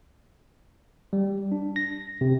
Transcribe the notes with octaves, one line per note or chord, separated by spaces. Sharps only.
G3
D4
A#6
C3